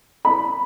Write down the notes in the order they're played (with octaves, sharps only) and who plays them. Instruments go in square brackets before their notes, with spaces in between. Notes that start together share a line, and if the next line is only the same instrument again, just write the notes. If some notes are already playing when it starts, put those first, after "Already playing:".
[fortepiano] B5